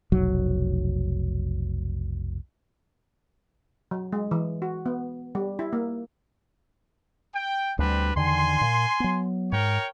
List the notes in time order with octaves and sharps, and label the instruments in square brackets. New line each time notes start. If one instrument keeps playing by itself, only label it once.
[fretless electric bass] F1 B1 F#3
[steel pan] F#3
G#3
E3
F#4
B3
G3
E4
A#3
[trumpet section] G5
[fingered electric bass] D2 G3 [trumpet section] C4 D4 B4
[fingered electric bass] E2 D3 D#3 [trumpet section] G#5 C6
[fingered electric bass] A#2
F#3 B3
[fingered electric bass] G#2 [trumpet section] A#4 C#5 G5